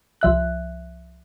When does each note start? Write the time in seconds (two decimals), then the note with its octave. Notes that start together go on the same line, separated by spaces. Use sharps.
0.21 C2 F3 E5 F#6